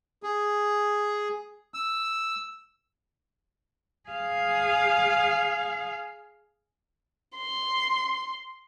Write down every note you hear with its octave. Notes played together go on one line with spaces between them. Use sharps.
G#4
E6
G#4 F5
C6